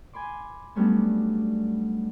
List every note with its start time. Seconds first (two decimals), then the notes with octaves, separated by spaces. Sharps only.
0.13 G#5 B5 C6 D6
0.75 F#3 G3 A3 B3 C#4 D4